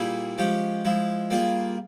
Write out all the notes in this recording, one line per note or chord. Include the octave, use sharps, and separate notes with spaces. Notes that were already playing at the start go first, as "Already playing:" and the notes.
Already playing: A#2 G3 A#3 E4 G#4
F3 G#3 C#4 G4
F3 G#3 E4
G3 A#3 F4 G#4